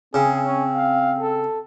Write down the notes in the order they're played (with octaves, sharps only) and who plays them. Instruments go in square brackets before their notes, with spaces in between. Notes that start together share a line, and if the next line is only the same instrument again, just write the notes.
[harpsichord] C#3 [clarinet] C4 [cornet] G#4
[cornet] C#4
F5
A4